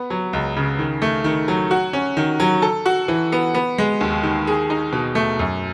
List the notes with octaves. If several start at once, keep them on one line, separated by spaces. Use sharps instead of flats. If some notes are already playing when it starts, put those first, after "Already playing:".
Already playing: B3
F#3
C#2
C#3
D#3
A3
D#3
F#3
F#4
C#4
D#3
F#3
A4
F#4
E3
B3
B3
G#3
D#2
D#3
G#4
D#4
B2
A3
F#2